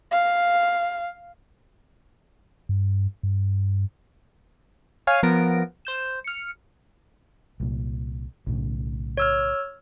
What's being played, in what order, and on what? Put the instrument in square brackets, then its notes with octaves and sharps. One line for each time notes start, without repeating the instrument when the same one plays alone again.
[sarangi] F5
[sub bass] G2
G2
[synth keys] C#5 F5 G#5 F6 D#7
F3 B3 A#4 A#6 D7
C5 G6 E7
F6 C#7
[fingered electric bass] C2 A#2
B1 A2 C#3
[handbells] C#5 E6 F6